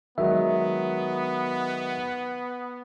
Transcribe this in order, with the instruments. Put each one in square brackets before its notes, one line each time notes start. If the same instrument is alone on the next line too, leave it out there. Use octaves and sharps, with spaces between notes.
[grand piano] D#3 F#3 G#3 [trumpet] B3 [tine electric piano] E5